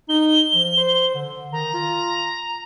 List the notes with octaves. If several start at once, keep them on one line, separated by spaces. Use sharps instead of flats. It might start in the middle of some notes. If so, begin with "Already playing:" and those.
D#4 G7
F3
C5
D3
D#3 A#5
F4